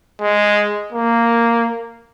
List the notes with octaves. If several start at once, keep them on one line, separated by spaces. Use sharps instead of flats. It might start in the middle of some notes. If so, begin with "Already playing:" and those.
G#3
A#3